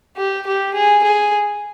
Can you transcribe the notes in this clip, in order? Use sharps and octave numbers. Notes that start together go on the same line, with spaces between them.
G4
G4
G#4
G#4